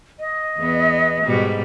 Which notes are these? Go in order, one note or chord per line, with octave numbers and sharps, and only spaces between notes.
D#5
E2 B3
G#2 B2 G3